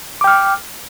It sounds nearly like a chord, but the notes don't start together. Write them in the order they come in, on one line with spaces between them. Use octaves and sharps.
D6 G5 F6